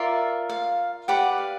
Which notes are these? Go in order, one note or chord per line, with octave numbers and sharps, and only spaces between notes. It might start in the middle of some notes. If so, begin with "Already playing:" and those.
Already playing: F4 A#4 D5 E5
F5
G4 B4 D5 F#5
F5